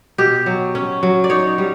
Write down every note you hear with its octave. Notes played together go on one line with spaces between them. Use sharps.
B2 G4
F#3
C#4
F#3
D5
D#4 C#5
G3